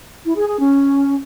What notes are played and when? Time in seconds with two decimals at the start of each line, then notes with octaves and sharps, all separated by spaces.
0.25 E4
0.36 G#4
0.48 G#4
0.59 C#4